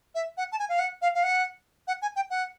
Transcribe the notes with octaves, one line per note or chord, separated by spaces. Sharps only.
E5
F#5
A5
G#5
F5
F#5
F5
F5
F#5
F#5
G#5
G5
F#5